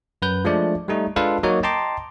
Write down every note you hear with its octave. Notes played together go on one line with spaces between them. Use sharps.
F#2 B4 G6
F3 G#3 A3 D4 D5
G3 A3 D#4
G#3 D4 F4 A4 B4 F5
F#3 A#3 D#4 F#4 A#4 C#5
D#5 G5 A5 A#5 C6 D6